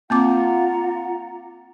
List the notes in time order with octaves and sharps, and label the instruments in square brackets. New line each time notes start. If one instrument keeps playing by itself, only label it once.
[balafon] A#3 C4 D6 [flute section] F4 F#5 A#5